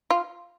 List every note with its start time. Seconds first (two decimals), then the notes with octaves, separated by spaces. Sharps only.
0.10 F4